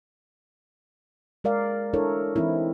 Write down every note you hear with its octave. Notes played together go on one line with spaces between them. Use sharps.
G#3 A#4 D5 F5
D4 E4 A4 A#4 C#5
E3 C4 D#4 E4